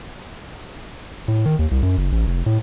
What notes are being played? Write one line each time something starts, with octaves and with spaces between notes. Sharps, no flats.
A2
D#3
D#2
C2
F#2
F#1
A1
F1
A2